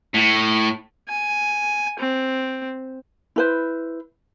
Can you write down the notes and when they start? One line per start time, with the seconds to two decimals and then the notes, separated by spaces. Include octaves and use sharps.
0.14 A2
1.09 G#5
1.99 C4
3.36 E4 B4 C5